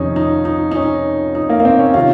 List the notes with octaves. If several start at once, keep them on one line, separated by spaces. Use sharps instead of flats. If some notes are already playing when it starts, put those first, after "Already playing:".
Already playing: F2 C3 D#3 C#4 D#4
D#4
D#4
D#4
C#4
D#4
A#3
A#3
C4
C#4
C3 D#3 F4